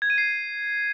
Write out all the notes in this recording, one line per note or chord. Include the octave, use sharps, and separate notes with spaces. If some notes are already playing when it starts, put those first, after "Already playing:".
G#6
D#7
C7